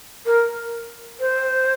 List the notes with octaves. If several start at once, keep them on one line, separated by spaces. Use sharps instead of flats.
A#4
C5